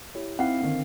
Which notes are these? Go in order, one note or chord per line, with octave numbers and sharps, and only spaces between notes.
E4 G4 C#5
C4 D#4 E4 F5 F#5
D3 D#3